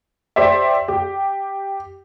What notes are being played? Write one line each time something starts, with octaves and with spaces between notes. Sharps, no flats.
G4 C5 D5 E5
G4